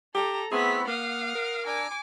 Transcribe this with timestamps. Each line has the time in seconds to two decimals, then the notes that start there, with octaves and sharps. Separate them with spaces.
0.15 G4 A4 A#5
0.51 A3 B3 C4 E4 G#4 B6
0.87 A#3 F5 F#5 D#6
1.35 A#4
1.66 D4 G#5 A#5 D6 E6